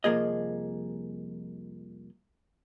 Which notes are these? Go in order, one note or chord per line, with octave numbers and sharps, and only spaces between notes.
C2 F2 F3 A#3 G#4 D#5